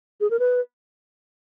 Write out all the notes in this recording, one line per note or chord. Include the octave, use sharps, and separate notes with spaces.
G#4
A#4
B4